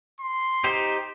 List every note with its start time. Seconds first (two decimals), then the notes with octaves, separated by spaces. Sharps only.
0.20 C6
0.64 D#4 G4 C5